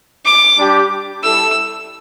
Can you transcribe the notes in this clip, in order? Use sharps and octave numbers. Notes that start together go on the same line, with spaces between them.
D6
G3 D4 G4
G3 E4 A4 E6